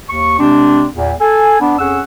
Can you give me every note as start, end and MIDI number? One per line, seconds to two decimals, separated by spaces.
0.09 0.38 39
0.09 0.38 85
0.39 0.86 48
0.39 0.86 56
0.39 0.86 60
0.39 0.86 62
0.94 1.13 40
0.94 1.13 46
1.21 1.57 69
1.21 1.57 80
1.61 1.77 59
1.61 1.77 62
1.79 2.01 41
1.79 2.01 61
1.79 2.01 68
1.79 2.01 78
1.79 2.01 88